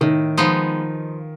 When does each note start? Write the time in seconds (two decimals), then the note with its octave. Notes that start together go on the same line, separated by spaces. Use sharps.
0.01 A2 D#3
0.37 F3 G#3 B3 D#4